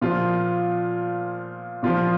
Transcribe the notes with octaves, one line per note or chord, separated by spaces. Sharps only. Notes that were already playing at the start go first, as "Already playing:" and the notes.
A#2 F3 F4
A#2 F3 F4